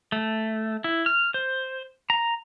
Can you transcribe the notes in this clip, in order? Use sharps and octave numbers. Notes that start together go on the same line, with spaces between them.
A3
E4
F6
C5
A#5